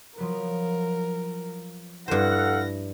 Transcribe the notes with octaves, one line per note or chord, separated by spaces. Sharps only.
F3 F#3 B3 A#4
G2 E4 A4 C5 F5 F#5 A#6